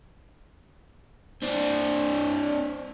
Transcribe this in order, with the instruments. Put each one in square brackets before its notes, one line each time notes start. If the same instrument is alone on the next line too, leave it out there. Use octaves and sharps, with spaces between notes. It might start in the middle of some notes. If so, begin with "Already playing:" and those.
[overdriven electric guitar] C4 D4